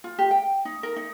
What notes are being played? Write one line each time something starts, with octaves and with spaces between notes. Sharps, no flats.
F4
G4
G5
D#4
A#4
D#4